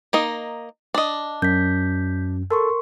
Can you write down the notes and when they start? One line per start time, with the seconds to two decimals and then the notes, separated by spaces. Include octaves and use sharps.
0.13 A#3 D#4 D#5
0.94 D4 D#5
1.42 F#2 G6 B6
2.50 A4 A#4 C6 C#6